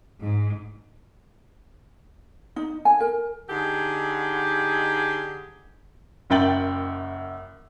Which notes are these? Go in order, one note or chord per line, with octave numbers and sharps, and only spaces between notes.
G#2
D#4
G#5
A#4
D3 D#4 G4 G#4
F#1 F#2 E5 G5 A6 F#7